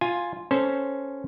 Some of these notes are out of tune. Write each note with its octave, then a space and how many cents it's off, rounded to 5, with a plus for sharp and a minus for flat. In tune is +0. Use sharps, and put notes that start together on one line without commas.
F4 +0 G#5 +0
C#4 +0 A4 +0 C5 +0